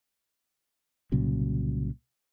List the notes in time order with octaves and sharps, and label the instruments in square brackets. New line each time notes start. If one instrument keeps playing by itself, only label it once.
[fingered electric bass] C2 A#2 C#3 F#3